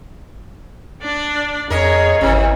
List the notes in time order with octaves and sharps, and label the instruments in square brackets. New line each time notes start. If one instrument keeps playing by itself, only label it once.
[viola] D4 D5
[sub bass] F2 [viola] G#4 C#5 [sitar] A#4 D#5
[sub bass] G#1 [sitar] C3 [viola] E3 C#4